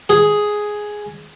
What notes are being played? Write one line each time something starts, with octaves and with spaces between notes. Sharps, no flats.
G#4